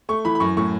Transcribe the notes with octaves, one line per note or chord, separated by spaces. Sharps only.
A3 C#6
E3 B5
B5
F#2 C#6
A2 C#6